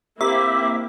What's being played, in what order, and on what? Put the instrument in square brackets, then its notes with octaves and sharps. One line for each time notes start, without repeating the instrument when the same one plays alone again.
[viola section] A#3 C4 E4 [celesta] G4 A#4 A#5 [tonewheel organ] E5 [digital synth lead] D6